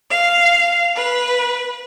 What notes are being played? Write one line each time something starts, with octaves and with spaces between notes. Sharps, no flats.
F5
B4